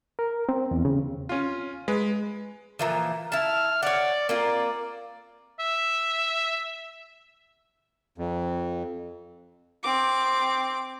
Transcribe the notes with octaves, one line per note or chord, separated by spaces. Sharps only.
A#4
C4
E2
C#3
C#4 F4
G#3 B4
A#2 E3 F3
E4 A5 F6
C#5 D5 F#5
A#3 C4 F4 D5
E5
F2
C4 D6